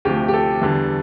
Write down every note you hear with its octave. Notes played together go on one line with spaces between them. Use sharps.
D2 C3 F3 A3 G4
G4
A4
E2 D3 G3